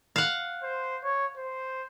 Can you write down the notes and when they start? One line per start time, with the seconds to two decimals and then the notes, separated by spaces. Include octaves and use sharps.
0.16 F5 F#5
0.63 C5
1.04 C#5
1.37 C5